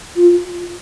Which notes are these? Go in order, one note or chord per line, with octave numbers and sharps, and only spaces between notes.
F4